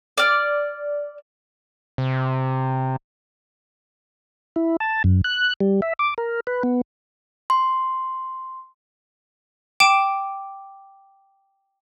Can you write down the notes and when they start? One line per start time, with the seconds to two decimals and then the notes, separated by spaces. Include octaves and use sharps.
0.18 D5 F6
1.98 C3
4.56 E4
4.80 A5
5.04 F#2
5.24 F#6
5.61 G3
5.82 E5
5.99 D6
6.18 A#4
6.47 B4
6.63 B3
7.50 C6
9.80 G5 D6 D7 E7